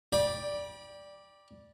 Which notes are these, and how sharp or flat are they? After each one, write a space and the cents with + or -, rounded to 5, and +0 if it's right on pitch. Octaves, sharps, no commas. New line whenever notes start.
D5 +0 G5 +20 B5 -35